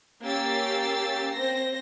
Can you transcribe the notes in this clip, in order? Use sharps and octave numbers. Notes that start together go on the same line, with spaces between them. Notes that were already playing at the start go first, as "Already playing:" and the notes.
A#3 C#4 G4 E6 A6 C7
C4 C5 A#6